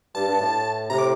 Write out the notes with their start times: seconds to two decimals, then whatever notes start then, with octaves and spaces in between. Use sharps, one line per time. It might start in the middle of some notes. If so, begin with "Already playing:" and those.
0.15 G2 A5
0.27 G2
0.40 A2
0.89 A2 C3 A#5
0.98 D6